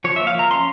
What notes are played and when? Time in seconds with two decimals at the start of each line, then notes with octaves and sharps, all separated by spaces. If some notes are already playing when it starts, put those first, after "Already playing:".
0.04 F3 C#5
0.16 A#3 E5
0.27 F5
0.35 F3 A#5
0.51 C#4 C6